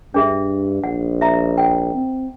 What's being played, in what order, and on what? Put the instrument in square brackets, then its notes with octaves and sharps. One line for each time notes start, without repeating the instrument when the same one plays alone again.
[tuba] G2 [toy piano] D4 G#4 E5
[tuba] A#1 [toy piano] F#5
[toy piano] E5 A#5
F#5 G5
[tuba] C4